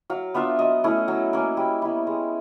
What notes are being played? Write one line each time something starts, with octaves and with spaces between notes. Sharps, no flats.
F#3 F5
B3 D4 F4 E5
F#3 D#5
A3 C#4 E4
F#3
A#3 C#4
G3
B3 E4
G#3